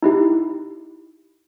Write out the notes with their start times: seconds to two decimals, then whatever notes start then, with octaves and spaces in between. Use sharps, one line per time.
0.03 D#4 E4 G4